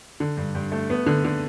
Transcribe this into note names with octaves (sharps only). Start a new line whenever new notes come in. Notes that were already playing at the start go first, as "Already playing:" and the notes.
D3
G2
G2
A3
B3
D3
D3